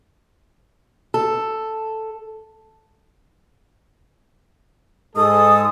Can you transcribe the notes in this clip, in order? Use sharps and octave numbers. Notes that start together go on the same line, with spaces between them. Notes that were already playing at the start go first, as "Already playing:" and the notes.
A4
G#2 G#3 A4 D#6